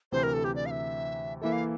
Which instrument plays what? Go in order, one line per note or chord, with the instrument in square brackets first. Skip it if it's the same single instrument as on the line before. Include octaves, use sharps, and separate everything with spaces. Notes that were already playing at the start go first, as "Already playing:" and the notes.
[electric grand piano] D2 C3 E3 [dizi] C5
[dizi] A#4
A4
G4
D5
F5
E5
[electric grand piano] E3 A#3 E4 A4 [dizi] E5
[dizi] F5